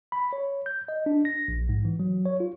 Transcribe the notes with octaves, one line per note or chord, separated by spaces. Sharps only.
B5
C#5
G6
D#5
D4
A#6
A#1
G#2
E3
F#3
C#5
F4